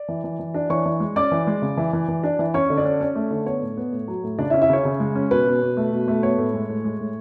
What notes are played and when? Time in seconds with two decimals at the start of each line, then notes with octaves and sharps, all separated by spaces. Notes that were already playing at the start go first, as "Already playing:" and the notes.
Already playing: D5
0.08 E3
0.24 E3
0.39 E3
0.54 D4
0.70 E3 C#5 C#6
0.86 E3
1.00 G#3
1.16 C#4 D5 D6
1.32 E3
1.47 G#3
1.62 C#3
1.77 E3
1.93 E3
2.08 E3
2.23 D4
2.39 E3
2.54 C#4 C#5 C#6
2.70 D3
2.78 D4 D5
2.85 C#4
3.01 C#4 C#5
3.15 A3
3.31 D3
3.46 B3 C#5
3.62 A2
3.77 B3
3.92 A2
4.08 F#3
4.23 A2
4.38 C#3 D4 D5
4.50 E4 E5
4.54 C#4
4.61 E4 E5
4.69 C#3 C#5
4.85 C#3
5.00 G#3
5.16 C#4
5.31 B2 B4
5.46 B2
5.62 B2
5.77 A3
5.92 B2
6.08 A3
6.23 B3 C#5
6.38 A2
6.54 G#3
6.69 A2
6.84 G#3
7.00 A2